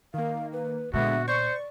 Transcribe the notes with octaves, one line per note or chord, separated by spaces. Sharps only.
D#3 A#3 F5
B4
A#2 D3 G#3 B3 F#4 E5
C5 D5 C#6